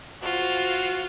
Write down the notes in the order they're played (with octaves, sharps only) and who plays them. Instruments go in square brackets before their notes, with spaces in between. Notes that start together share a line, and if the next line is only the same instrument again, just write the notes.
[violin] F4 C5 [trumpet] F#4